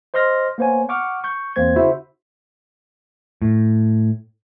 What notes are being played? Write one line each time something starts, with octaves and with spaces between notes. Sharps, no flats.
C5 D#5 C6 F6 A#6
A#3 B3 C5 C#5 G#5
F#5 C#6 D6 F6
C#6 G6
E2 A#3 C4 C5 G#6
C#3 E4 F#4 C5 E5
A2